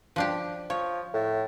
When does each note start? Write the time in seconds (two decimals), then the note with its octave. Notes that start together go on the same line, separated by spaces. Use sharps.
0.16 F3 D4 G4
0.70 F3 C#5
1.14 A2